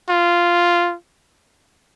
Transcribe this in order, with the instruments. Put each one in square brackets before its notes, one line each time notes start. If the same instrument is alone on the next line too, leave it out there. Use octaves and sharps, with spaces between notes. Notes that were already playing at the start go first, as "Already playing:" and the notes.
[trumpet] F4